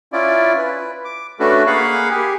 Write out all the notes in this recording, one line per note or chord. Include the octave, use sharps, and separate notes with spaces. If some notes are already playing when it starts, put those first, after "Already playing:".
C#4 E4 F4 D5
B4
D6
A3 C#4 D4 F#4 A4 B4
A#3 G#4 F5 F#5 B5
G4 G#4